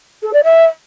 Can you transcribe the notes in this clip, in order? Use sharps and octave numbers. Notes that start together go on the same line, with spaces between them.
A4
D5
E5